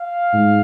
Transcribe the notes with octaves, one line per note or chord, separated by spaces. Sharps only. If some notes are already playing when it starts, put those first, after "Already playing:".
Already playing: F5
G#2